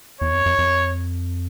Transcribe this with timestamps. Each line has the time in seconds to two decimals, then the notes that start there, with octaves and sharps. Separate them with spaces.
0.21 E2 C#5
0.33 F2
0.46 F2
0.59 F2